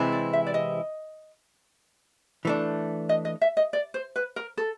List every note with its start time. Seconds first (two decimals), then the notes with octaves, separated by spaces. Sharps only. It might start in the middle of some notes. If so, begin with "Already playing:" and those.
Already playing: C3 E3 G#3 C4 E4
0.12 D5
0.33 E5
0.46 D5
0.54 D#5
2.45 E3 A3 D4
3.09 D#5
3.25 D#5
3.41 E5
3.57 D#5
3.73 D5
3.94 C5
4.16 B4
4.36 A#4
4.57 A4